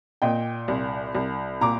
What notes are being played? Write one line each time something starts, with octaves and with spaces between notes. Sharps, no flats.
A#2 D#5 G5
C2
C2
A#2 A#5 D6